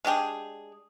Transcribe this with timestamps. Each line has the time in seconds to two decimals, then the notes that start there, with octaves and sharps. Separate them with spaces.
0.05 G#3 D4 G4 G#4